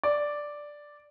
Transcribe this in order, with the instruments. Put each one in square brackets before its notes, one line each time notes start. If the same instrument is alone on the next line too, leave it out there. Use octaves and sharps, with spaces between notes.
[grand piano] D5